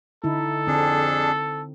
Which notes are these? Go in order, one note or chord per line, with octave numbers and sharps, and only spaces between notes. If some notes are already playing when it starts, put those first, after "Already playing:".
D3 D#4 E4 A4
F2 D3 C4 D4 G#4